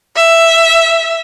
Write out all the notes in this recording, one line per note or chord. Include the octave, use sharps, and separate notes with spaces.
E5